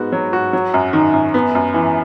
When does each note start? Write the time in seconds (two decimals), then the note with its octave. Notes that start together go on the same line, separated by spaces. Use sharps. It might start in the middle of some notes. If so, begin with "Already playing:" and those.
Already playing: G#2 B3 F#4
0.12 F#3
0.33 F#4
0.53 F#3
0.74 F#2
0.93 D#3
1.14 F#2
1.34 B3
1.55 F#2
1.74 E3